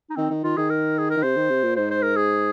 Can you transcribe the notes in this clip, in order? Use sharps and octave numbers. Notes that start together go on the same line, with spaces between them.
D#4
D#3 C4
D#3
D#3 F4
D#3 G#4
A#4
G#4
A#4
D#3
C3 C5
D#3
C3
A#2
G#2 C5
C5
A#4
G#4